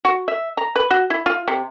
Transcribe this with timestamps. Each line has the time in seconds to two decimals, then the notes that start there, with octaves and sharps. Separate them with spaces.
0.05 F#4
0.28 E5
0.57 A#5
0.76 B4
0.91 F#4
1.10 E4
1.26 F4
1.48 C3